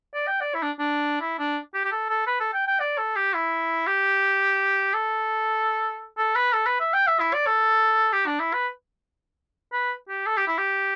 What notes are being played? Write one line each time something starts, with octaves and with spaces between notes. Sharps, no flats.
D5
G5
D5
E4
D4
D4
E4
D4
G4
G4
A4
A4
B4
A4
G5
G5
D5
A4
G4
E4
G4
A4
A4
B4
A4
B4
E5
G5
E5
E4
D5
A4
G4
D4
E4
B4
B4
G4
A4
G4
E4
G4